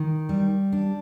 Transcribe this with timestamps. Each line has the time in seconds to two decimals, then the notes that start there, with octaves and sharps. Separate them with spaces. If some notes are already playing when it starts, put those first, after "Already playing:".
Already playing: D#3
0.29 G3
0.72 D4